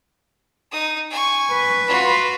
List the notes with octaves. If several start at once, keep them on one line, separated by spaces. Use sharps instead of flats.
D#4 D#6
G#5 C#6
B4
F4 F#4